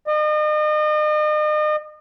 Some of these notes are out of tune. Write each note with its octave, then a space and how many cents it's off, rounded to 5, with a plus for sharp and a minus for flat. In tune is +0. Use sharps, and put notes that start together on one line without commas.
D#5 -40